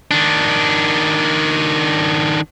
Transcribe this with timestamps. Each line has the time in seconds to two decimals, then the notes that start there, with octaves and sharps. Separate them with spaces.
0.11 D#3 D4